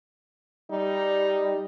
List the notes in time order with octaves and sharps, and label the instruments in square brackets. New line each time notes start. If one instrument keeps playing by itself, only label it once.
[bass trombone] G3 [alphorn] D#4